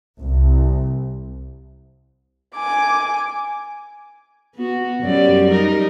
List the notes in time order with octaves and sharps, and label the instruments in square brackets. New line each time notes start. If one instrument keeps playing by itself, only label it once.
[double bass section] C2
[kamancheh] G#5 D6
[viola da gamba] B3 F#4
F#2 G3 D5
G3 D#4 A#4